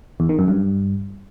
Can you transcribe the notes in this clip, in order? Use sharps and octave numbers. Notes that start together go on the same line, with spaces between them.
E2
D#3
F#2
G2